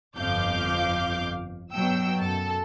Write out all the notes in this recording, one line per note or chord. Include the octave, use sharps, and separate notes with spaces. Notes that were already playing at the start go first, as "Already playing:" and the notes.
G1 F2 F5 D6 G6
G2 B2 F#3 G5 E6
F#2 A4